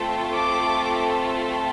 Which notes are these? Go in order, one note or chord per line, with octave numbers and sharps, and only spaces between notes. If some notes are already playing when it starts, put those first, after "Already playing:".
Already playing: A3 C4 F4 A4
D6